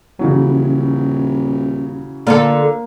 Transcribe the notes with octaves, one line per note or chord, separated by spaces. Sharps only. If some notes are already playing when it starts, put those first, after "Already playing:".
D#1 C#3 E3 F#3
D3 A#3 F4 A4